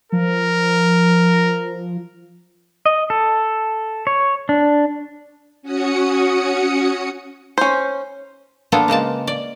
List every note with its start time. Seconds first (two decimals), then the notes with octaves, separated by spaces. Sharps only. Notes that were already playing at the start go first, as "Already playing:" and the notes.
0.12 F3 A#4
2.86 D#5
3.10 A4
4.07 C#5
4.49 D4
5.62 C#4 F#4 D#6 C#7
7.58 C#4 C5
8.72 A#3 B3 D4 F4 G#4 A4
8.88 C#3 G#3 A#3 A5
9.27 D5